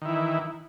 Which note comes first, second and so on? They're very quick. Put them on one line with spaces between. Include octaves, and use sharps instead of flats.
D#3 E4 E3